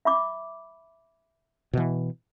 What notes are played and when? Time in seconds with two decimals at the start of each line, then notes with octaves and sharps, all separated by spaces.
0.05 E5 B5 D6
1.73 B2 E3